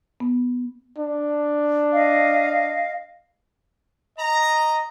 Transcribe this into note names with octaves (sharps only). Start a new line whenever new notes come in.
B3
D4
D#5 F5
D#5 A#5